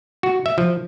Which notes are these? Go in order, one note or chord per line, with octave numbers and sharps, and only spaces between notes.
F#4
E5
F3